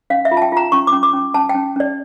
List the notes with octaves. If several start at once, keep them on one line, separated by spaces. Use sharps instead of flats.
C#4 F5
E5
F4
A5
G5
F4 A#5
C#4 C#6
D6
C#4
D6
C#4
C#4 A5
G5
C#4
C#4 D5